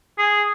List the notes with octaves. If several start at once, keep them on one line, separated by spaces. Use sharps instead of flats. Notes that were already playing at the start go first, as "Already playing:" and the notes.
G#4